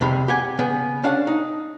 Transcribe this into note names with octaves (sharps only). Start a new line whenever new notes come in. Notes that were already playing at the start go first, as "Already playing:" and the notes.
C2 F2 C3 G#3 B5
G4 F#5 G#5
C#3 B3
C#4 D4 F5 F#5
D#4